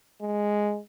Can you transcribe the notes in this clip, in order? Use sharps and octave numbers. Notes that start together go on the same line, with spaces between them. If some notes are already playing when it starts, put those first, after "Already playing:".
G#3